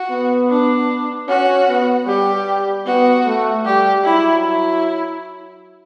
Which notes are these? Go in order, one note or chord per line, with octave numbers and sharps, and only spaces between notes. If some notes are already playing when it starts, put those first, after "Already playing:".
Already playing: F#4
B3
D4
C#4 F#4
B3
G3 G4
B3 F#4
A3
G3 G4
F#3 E4
E4